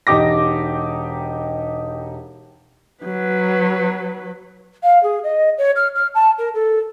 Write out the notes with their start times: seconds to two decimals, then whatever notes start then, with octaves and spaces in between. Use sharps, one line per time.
0.07 E1 D#4 G4 D6 A#6
3.04 F#3 B4
4.83 F5
5.03 G#4
5.23 D#5
5.58 C#5
5.76 F6
5.95 F6
6.14 A5
6.38 A#4
6.54 A4